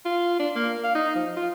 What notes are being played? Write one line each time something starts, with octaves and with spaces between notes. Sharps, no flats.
F4
D4
A#3
F5
D#4
F3
F4